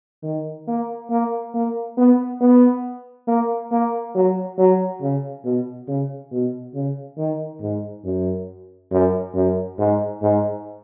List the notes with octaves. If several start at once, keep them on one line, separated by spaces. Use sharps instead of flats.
D#3
A#3
A#3
A#3
B3
B3
A#3
A#3
F#3
F#3
C#3
B2
C#3
B2
C#3
D#3
G#2
F#2
F#2
F#2
G#2
G#2